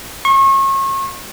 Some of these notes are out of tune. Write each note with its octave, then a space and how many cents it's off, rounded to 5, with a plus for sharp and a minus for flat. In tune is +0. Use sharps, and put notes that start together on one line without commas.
C#6 -35